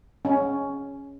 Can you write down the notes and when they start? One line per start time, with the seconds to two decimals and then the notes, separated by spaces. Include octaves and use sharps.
0.25 C#4